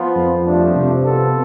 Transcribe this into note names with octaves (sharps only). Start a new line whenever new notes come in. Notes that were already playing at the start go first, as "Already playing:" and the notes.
Already playing: F3 B3 F4
F2
G2 F3 A3 D4
C3
B2 B3 F4 A4